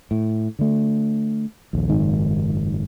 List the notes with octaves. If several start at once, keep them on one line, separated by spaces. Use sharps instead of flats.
A2
D3 A3
A#1 D#2
F#1 G#2 D#3